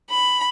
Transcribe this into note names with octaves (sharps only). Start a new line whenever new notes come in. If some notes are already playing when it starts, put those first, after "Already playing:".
B5